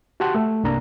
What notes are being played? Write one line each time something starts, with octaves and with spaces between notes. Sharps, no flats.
F#4 G4 F#5 A5 C6 F#6
A3 A4
C2 G2 A#3 D4 A#5